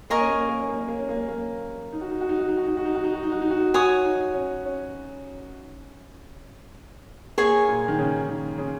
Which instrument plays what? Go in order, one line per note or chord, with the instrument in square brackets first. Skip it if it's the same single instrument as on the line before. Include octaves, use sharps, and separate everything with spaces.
[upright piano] A#3 [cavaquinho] A#4 D#5 G#5 C#6
[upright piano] C#4
A#3
C#4
A#3
C#4
A#3
C#4
A#3
C#4
A#3
C#4
A#3
D#4
F#4
D#4
F#4
D#4
F#4
D#4
F#4
D#4
F#4
D#4
F#4
D#4
F#4
D#4
F#4
D#4
F#4
D#4
[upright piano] F#4 [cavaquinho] C#5 G#5 D#6
[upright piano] D#4
C#4
C#4
[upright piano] A#3 [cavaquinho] G#4 C#5 G#5
[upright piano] A#2
D#3
C#3
D#3
C#3